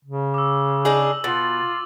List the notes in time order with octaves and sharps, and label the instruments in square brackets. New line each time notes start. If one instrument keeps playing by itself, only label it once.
[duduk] C#3
[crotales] D6 E6
[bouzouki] D4 D#4 G#4 [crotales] F#7
[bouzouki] B2 [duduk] F4 [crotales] A6 F#7